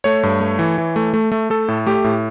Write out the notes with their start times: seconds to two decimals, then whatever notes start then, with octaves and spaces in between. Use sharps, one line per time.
0.04 A3 C#5
0.23 G2
0.41 A3
0.59 E3
0.78 E3
0.96 A3
1.14 A3
1.32 A3
1.50 A3 A4
1.68 A2
1.86 A3 G4
2.04 A2